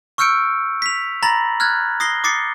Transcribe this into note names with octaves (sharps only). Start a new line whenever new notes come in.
C#6 E6 F6 G6 C#7 D7
B6 F7
A#5 B5 A6 A#6 F#7
F6 F#6 G#6 A6
D#6 A#6 C7 G7
D6 D#6 A6 C7 C#7